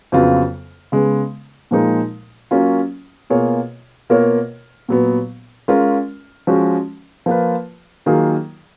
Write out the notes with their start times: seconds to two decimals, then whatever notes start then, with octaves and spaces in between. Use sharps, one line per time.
0.12 F2 C#3 F#3 B3 F4
0.92 C#3 G#3 B3
1.71 A#2 F3 G#3 D#4 A#4
2.51 F#3 A#3 C#4 F4
3.30 B2 A#3 F4 G#4 C#5
4.10 B2 A#3 F4 A#4 C#5
4.89 A#2 F#3 B3
5.68 G#3 C#4 F4 A#4
6.47 F3 G#3 C#4 F#4
7.26 F3 A#3 F4 B4
8.06 D#3 F#3 A#3 F4 G#4